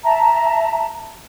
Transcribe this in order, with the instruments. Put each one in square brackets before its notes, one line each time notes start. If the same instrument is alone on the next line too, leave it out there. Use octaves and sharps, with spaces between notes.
[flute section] E5 A5 A#5